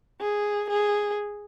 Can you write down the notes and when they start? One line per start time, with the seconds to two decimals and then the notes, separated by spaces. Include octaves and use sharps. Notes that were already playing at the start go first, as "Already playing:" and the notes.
0.21 G#4
0.70 G#4